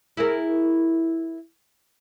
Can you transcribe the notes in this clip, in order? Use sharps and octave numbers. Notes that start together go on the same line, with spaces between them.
E4 G#4 A#4